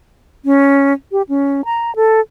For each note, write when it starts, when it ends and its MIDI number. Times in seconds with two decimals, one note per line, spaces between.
0.45 0.93 61
1.12 1.22 67
1.29 1.61 61
1.65 1.94 82
1.96 2.20 69